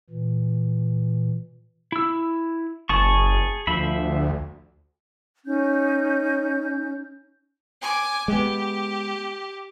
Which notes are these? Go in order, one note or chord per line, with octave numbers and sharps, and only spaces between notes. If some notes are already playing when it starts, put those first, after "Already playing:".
A#2 E3
E4 E6
F#1 G#4 A5 C#6
D2 F3 E5 B5
C#4 D#4 G6
G#5 D6
G#3 B3 G4